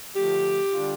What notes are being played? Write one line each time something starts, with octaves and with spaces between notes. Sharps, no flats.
D3 F3 A3 G4
D3 G3 D4 F4